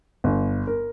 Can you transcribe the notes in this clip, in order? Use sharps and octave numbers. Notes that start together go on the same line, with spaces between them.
G1
A#4